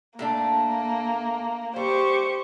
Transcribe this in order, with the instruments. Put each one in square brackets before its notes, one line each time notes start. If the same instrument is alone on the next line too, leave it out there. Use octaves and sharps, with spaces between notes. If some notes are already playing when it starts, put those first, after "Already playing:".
[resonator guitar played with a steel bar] A2 A3 D4 [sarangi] A#3
[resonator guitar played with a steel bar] G3 [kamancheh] G4 C#6 [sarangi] C5